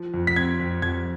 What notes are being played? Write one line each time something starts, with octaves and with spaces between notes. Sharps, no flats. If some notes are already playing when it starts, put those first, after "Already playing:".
Already playing: F3
F2
B6
C4 G#6
F2
F2 G#6